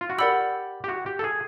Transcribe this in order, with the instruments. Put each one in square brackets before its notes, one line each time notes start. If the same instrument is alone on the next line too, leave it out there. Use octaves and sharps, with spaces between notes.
[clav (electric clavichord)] F4
F#4
[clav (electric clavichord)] G4 [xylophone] A#4 D5 F#5 B5 E6
[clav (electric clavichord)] G4
F#4
G4
A4
G#4